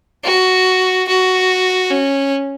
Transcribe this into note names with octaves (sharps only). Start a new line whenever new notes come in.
F#4
F#4
C#4